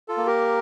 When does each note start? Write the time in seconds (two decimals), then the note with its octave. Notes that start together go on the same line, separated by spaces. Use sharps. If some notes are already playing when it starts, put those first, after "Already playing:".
0.08 F4 A4
0.17 A#3
0.26 G4 A#4